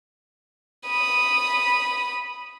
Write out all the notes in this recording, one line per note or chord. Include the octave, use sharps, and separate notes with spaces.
B5 D#6